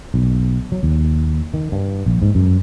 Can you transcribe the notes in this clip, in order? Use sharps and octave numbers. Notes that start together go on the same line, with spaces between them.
B1
F#3
D#2
D#3
G2
A#1
G#2
F#2